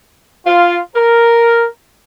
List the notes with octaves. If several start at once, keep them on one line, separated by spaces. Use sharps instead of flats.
F4
A#4